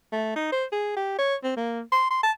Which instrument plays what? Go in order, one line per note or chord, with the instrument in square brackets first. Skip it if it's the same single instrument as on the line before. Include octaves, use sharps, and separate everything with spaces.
[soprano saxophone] A3
D#4
C5
G#4
G4
C#5
C4
A#3
C6
C6
A5